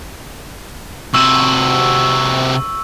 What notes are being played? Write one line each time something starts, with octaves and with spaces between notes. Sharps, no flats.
C3 F#4 C#6 E6